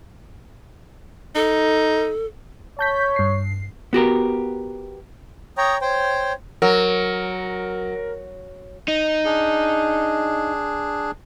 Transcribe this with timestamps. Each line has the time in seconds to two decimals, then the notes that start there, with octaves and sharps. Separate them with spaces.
1.35 D#4 A4
2.79 C#5 A5 G6 B6
3.16 G2 C7
3.93 B3 F#4 G4 A#4
5.58 C#5 G5 A#5 D#6
5.81 C5 C#5 G5
6.62 F#3 A#4
8.88 D#4
9.25 D4 G#4